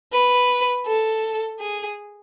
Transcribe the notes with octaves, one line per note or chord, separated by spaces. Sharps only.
B4
A4
G#4